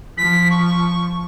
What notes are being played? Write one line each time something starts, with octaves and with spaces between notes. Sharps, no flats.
F3 B6
C#6